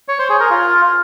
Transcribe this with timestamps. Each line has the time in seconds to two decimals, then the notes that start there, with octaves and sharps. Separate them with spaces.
0.08 C#5
0.19 C5
0.29 G#4
0.40 A#4
0.51 F4